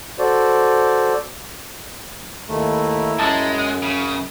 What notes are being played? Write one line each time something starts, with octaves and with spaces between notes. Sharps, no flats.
F#4 A4 C5 D5
D#2 A3 E4 A#5
F#2 G#3 A5
C#3